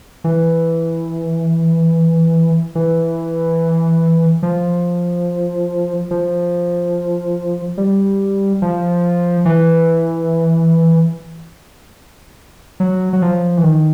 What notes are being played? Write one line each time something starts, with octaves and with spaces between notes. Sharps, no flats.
E3
E3
F3
F3
G3
F3
E3
F#3
F#3
F3
E3
D#3